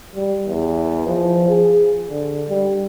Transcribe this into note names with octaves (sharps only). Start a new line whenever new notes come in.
G3
E2
F3
G#4
D3
G3